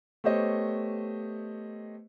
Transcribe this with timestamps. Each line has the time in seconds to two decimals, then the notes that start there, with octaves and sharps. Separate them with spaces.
0.24 A3 B3 G4 C5 C#5 D#5